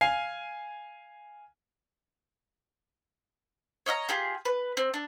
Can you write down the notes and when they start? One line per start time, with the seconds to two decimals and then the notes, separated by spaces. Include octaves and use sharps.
0.01 F5 G#5 C7
3.86 C#5 D#5 E5 A#5
4.09 F4 G4 G#4
4.45 B4
4.77 C4
4.94 D4